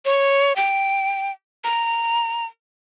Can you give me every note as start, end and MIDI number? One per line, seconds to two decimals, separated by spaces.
0.05 0.53 73
0.56 1.31 79
1.64 2.46 82